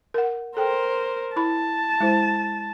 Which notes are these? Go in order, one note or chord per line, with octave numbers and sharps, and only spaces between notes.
A#4 F#5
A4 A#4 C5 G5
E4 A5 B5
G#3 E4 C5